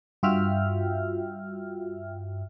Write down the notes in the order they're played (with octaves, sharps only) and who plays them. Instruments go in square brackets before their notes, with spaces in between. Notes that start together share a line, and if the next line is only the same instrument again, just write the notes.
[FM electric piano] G2 F4 F#4 E5 G5 F6